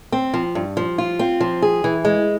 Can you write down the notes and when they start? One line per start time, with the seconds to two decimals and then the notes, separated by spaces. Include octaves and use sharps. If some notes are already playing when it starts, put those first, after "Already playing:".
0.12 C4
0.34 F3
0.55 G2
0.77 F3
0.98 F4
1.19 C4
1.41 F3
1.62 G#4
1.84 E3
2.05 G#3